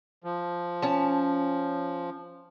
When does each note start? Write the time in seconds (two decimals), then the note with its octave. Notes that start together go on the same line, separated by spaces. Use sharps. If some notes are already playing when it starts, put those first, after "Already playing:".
0.24 F3
0.82 C#4 A5